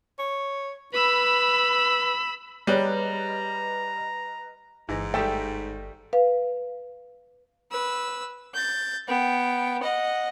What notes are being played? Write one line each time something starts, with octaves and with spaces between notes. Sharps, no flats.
C#5
B4 B5 E6
G3 G4 G#4 B4 C#5 D#5 A#5 F6
G1 G#2 E3 D#4 A#6
D#3 G3 A3 A4 G5
B4 F5
B4 E6
G6 A6
B3 G5
D#5 F#5